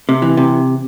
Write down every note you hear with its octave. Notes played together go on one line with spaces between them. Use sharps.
C3
E3
C3